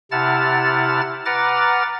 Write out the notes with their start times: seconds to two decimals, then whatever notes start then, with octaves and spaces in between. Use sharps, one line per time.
0.11 C3 E4 F#5 A5 F6 A6
1.26 B4 F#5 A#5 D6 F6 A6